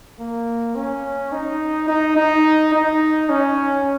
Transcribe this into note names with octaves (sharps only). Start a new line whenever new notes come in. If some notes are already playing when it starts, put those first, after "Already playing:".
A#3
C#4
D#4
D#4
D#4
D#4
C#4